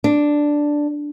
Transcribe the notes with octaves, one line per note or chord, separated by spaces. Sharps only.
D4